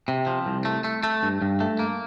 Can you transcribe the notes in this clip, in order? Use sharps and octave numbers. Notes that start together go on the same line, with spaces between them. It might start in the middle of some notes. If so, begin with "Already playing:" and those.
C3
F3
C2
A3
A3
A3
G2
G2
A3
A#3